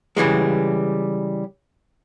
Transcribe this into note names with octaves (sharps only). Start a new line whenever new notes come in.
C#3 E3 G3 G#3